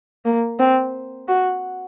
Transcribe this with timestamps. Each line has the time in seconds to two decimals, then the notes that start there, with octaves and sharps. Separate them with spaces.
0.25 A#3
0.59 C4
1.28 F#4